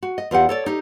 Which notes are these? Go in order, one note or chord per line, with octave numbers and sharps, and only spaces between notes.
F#4
D#5
E2 F4 G4 F#5
A4 C#5 D5
D#4 G4